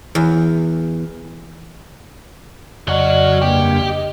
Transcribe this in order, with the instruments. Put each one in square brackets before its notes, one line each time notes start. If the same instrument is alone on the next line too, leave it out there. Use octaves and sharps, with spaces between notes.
[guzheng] E2
[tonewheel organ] F2 C#3 [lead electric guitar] F#3 F#4 [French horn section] D5 D#5
[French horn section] G2 A#3 [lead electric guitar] G4
[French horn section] D#5